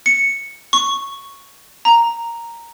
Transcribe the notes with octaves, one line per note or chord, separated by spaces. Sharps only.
C#7
C#6
A#5